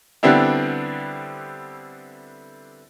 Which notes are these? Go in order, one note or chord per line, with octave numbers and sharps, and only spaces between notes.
D3 G3 B3 C4 D4 E4